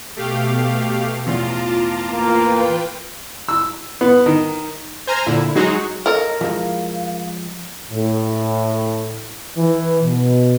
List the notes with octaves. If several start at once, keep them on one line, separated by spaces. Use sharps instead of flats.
B2 A3 G4 F5
E2 A2 F4 A5 A#5 D6
A#3 B4 G5
E6
B3
D#3
C5 G#5 A#5 F6
A#2 D3 E4
F#3 G#3 D#4 F#4 G#4
A4 A#4 C#5 D#5 F5
F3 G3 G#3 E4 F5
A2
E3
B2